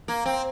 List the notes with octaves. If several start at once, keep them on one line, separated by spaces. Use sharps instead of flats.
A#3
C4